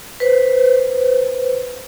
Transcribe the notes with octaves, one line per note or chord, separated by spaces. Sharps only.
B4 C5